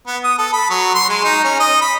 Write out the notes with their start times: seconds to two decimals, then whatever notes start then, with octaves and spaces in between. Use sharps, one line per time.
0.07 B3
0.24 D#6
0.38 A4
0.53 B5
0.70 F#3
0.95 C6
1.09 G#3
1.24 D#4
1.44 C#4
1.60 D#5
1.81 B5